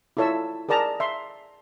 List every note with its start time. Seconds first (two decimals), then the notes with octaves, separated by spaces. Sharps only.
0.17 E4 F4 A4 C#5 E5 E6
0.69 G#4 A#4 D5 A5 A#5
1.00 E5 C6